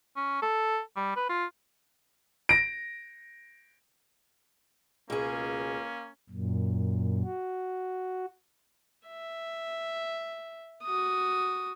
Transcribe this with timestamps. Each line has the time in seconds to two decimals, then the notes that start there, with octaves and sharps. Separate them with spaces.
0.16 C#4
0.42 A4
0.96 G3
1.16 B4
1.29 F4
2.49 A#6 D7
5.10 C#2 B2 A#3 C#4 G#4
6.30 F#2 A#2
7.23 F#4
9.07 E5
10.83 F#4 D#6